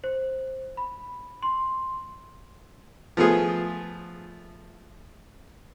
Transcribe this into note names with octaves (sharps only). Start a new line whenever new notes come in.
C5
B5
C6
F3 A3 B3 F4 G#4